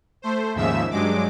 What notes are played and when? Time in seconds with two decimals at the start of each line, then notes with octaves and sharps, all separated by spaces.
0.22 A3 C5
0.55 D#2 G#2 C#3 F3 E5 E6
0.90 G2 F#3 G#3 D6